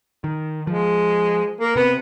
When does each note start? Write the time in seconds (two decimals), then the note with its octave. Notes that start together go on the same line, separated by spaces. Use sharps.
0.24 D#3
0.67 F3 G#3
1.61 A#3
1.76 C3 B3